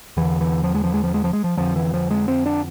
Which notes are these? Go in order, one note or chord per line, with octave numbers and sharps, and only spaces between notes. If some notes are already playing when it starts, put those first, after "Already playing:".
E2 D3 E3
E3
F3
G#3
F3
G#3
F3
G#3
F3
G#3
F3
F2 D3 F3
E3
F3
G#3
C4
D4